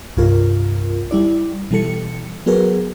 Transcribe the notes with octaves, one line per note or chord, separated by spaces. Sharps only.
C2 G2 F4 A#4
G3 E4 D5
B2 E3 G3 A4 C#7
F#3 B3 F#4 G#4 A#4 B4